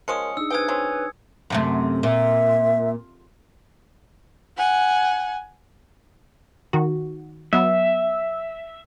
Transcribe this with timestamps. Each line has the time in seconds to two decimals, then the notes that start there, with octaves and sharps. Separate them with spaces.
0.08 F3 G#3 C#4 A#4 D#6 C#7
0.37 D4 D#4 G#4 E6
0.50 C3 B4 G5 G#5 D#6 G#6
0.68 F#3 C4 C#4
1.50 F#2 C3 A3
2.03 A#2 E5
4.57 F#5 G#5
6.73 D#3 F#4
7.53 F#3 B3 E5